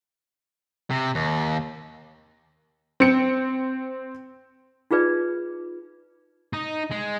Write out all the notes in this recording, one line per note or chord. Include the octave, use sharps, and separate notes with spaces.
C3
D#2
C4 C#7
D#4 F4 G#4 B4 D5
D#4
G#3